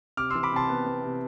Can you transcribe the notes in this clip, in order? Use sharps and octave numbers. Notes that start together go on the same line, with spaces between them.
C3 D6 F6
E3 C6 E6
B5 D6
C3 A5 C6
B3
B3
C3